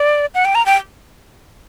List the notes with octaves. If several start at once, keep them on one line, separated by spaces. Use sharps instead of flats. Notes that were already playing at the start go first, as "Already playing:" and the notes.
Already playing: D5
F#5
G5
A#5
G5